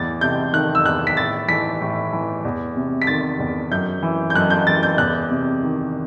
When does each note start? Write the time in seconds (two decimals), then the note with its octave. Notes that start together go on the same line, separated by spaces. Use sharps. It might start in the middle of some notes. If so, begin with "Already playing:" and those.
Already playing: E2 A2 E3 A6
0.21 C3 G6
0.53 D#3 F#6
0.75 E6
0.85 E2 F#6
1.07 B6
1.17 A2 A6
1.48 E3 B6
1.81 A2
2.13 E3
2.45 E2
2.75 C3
3.02 B6
3.07 D#3 A6
3.39 E2
3.71 F#2 G6
4.03 E3
4.30 G6
4.35 F#2 F#6
4.50 G6
4.67 E3 A6
4.83 G6
4.98 E2 F#6
5.30 C3
5.63 D#3